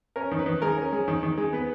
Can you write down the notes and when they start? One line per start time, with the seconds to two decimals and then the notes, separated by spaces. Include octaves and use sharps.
0.16 C#4 A#4
0.32 D#3
0.39 B4
0.46 D#3
0.62 G#3 A#4
0.78 C#4
0.92 G#3
1.08 D#3
1.23 D#3
1.38 G#3
1.53 B3 B4